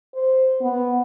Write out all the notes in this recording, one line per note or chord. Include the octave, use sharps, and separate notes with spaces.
C5
B3